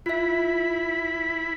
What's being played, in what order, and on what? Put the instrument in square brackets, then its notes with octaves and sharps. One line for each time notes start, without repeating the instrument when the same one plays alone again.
[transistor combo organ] E4 B5 [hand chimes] F4 E5